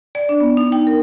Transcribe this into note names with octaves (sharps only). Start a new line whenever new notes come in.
D5
D4
B3
D#4
G5
A#4